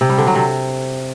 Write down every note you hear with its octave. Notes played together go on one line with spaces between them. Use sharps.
C3
G3
D3
F#3
C3